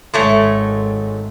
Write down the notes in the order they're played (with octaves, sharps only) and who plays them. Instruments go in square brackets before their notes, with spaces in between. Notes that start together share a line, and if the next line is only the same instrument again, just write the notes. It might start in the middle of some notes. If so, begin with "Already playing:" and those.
[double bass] G#1 G#2 [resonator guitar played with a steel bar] G#3 A3 C#5